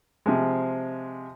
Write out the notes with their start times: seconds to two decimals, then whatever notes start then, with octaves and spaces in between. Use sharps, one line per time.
0.26 C3 F3 G#3